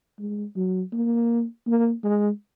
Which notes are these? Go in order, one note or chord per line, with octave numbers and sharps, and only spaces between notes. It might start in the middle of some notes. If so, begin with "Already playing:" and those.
G#3
F#3
A#3
A#3
G#3